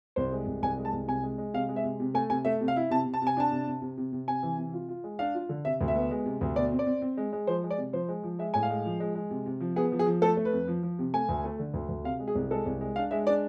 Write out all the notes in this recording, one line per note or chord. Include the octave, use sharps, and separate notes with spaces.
C2 C5
G#3
C2
C2 G#5
G#3
A5
C2
C3 G#5
G#3
G#3
C3 F5
G#3
E5
C3
C3
A3 G#5
C3 G#5
A3 E5
C3
F5
E4
C3 A5
C3
A5
C3 G#5
D4 A5
C3
C3
C3
C3
C3
C3 G#5
E3
C3
F4
F4
G#3
D4 F5
F4
D3
C3 E5
D2
E5
B3
G#3
C3
D2
B2 D5
C4
D5
C4
C4
G#3
G#3
F3 C5
G#3
D5
C3
F3 C5
G#3
F3
G#3 E5
A2 G#5
F5
G#3
F3
G#3
G#3
C3
C3
F3
B3 G#4
F3
G#4
F3
A3 A4
A3
B4
F2
F3
F3
C3
A3 G#5
D2
A3
D3
D2
D2
C3 F5
G#3
G#4
C2
G#3 A4
C2
G#3
D4 F5
G#3 E5
D4 D5